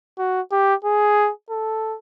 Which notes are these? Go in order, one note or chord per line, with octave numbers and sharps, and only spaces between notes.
F#4
G4
G#4
A4